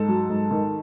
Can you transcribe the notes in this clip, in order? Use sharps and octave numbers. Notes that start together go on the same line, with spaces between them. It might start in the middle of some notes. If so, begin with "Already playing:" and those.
Already playing: G#2 A4
F#3
G#2
D#3